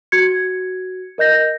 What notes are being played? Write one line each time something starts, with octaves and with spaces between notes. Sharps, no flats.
F#4 G#6 C#7
A#4 D#5 G6 A#6